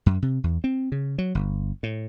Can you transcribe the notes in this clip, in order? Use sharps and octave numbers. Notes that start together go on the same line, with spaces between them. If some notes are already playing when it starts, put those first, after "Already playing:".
F#2
C3
E2
C4
C#3
F#3
G1
A2